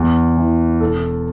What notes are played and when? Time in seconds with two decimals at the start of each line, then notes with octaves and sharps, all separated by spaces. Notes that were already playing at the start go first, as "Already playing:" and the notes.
Already playing: E2
0.37 E3
0.81 E1 A4